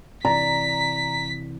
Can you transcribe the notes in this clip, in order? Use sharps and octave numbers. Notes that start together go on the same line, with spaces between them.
C3 E3 D5 A#5 B6